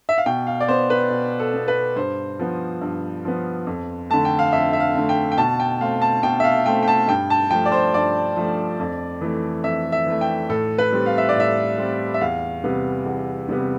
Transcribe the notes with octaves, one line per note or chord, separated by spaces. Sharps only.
E5
F5
B2 G5
F5
D5
B3 C5
B4
B2
A4
B3
B4
G2 C5
F3 B3
G2
F3 B3
F2
D3 A3 A5
G5
F5
F2 E5
E5
F5
D3 A3
G5
G5
B2 A5
G5
A3 C4 F5
A5
B2 G5
E5
F5
A3 C4 G5
G5
A5
G2 G5
A5
F3 A3 G5
D5
C5
G2 D5
F3 A3
F2
E3 A3
F2 E5
E5
E3 A3
G5
A2 A4
B4
G3 C4
F5
E5
D5
A2 E5
G3 C4
E5
E2 F5
C3 G3 B3
E2
C3 G3 B3